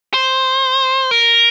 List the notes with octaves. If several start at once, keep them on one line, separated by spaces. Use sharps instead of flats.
C5
A#4